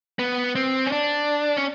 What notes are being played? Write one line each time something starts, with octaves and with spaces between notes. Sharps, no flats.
B3
C4
C#4
D4
C#4